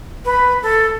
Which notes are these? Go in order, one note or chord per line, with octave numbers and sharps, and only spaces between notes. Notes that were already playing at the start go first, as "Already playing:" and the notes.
B4
A4